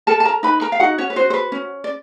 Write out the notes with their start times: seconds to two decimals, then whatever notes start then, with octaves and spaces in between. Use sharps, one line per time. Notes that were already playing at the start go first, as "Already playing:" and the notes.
0.07 A4 A#4 A5
0.20 A5
0.25 A#4 A#5
0.43 D#4 B4 B5
0.61 A#4 A#5
0.72 F5
0.80 D#4 F#4 F#5
0.98 C#4 C#5
1.10 B4
1.16 F#4 C5
1.30 C5
1.34 B4
1.52 C#4
1.84 D5